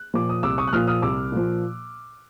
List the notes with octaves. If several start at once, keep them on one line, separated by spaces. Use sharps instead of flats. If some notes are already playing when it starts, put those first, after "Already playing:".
Already playing: F#6
A#2 F3 D6
D#6
C2 D6 E6
C#6 D#6
F#6
A#2 F3 D#6 F6
D#6 F6
C2 D6 E6
A#2 F3